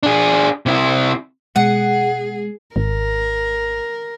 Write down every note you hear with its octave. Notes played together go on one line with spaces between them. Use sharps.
D4 G#4
C3 E4
B2 G#3 G#4 F#5
G#1 A#4